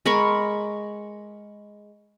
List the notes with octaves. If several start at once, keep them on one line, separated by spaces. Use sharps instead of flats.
G#3 A#4 B5 C#6